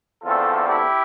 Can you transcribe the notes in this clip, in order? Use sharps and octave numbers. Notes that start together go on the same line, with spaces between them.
E2 D3 A3 C4 F4 A4
E4 G4